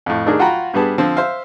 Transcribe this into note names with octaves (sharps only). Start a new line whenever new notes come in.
F2 A2
D#3 A3 D4 D#4 G#4 A#4
F4 F#4 F#5 G5 A#5 B5
G2 G3 B3 G#4 A5
D3 F3 C4
C5 E5 F5